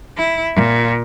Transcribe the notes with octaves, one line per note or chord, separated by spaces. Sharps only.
E4
A#2